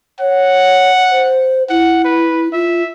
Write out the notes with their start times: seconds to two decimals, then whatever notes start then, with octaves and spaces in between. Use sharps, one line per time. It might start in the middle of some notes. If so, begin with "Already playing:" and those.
0.20 C#5 F#5
1.12 C5
1.70 E4 F#5
2.05 B4
2.53 F4 E5